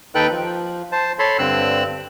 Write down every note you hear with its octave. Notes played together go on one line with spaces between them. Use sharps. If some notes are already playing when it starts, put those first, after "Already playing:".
D#2 D#4 A4 B4 G5 F#6
F3
C5 A5
A4 C#5 A5 B5 C6
G2 D3 C4 E6 F#6